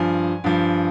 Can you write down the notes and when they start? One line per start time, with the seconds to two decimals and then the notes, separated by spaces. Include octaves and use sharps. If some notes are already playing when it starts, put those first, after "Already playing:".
Already playing: G2 F3 G#5
0.44 G2 F3